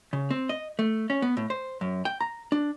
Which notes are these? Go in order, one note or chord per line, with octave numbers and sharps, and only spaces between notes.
C#3
C4
D#5
A3
C#4
B3
A2
C5
F#2
G5
A#5
D4